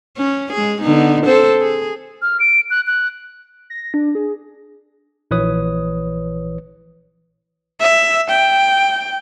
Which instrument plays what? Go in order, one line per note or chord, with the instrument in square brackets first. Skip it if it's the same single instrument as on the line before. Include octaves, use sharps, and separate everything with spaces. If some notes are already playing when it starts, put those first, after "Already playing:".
[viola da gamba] C#4
G#3 G#4
D3 B3 D#4
C4 A4 C5
G#4
[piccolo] F6
D7
F#6
F#6
[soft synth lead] A#6
D4
G#4
[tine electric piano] A#1 E3 B4 C#5 D#6
[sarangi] E5
G5